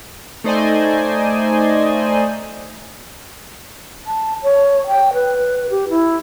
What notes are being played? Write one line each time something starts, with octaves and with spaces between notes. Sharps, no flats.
A3 D#4 C5 D5 D#5 G#5
A5
C#5
G5
B4
G4
E4